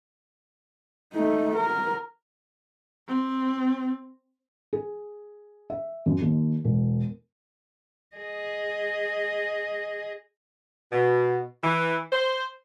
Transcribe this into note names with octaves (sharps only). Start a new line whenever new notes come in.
A3 D#4
A#4
C4
G#4
E5
F#2
D#2
E1
G#4 D#5
B2
E3
C5